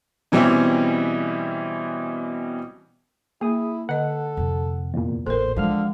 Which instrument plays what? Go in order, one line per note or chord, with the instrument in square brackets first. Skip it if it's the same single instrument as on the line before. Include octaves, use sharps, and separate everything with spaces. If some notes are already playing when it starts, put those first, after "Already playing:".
[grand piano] B2 E3 G3 C4 C#4 E4
[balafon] A#3 [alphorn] E4 [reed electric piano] G#4 D#6
[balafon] D3 D#5 [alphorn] A4 [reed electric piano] F#5
[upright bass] F2 C3
[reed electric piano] E2 A#2
[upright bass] A1 [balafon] A4 A#4 [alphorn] C5
[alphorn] D3 [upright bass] E3 G#3 [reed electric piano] F3 F5 F6